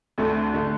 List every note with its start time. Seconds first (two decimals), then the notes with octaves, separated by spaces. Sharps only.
0.18 D2 D3 A3
0.54 D3 A3